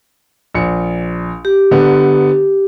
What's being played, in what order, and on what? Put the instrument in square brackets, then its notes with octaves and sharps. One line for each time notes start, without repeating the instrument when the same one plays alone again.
[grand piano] A#1 C#7
[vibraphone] G4
[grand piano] D3 B3